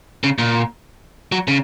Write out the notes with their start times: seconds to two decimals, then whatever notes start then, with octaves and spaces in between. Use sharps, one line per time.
0.24 C#3
0.38 A#2
1.32 F#3
1.48 C#3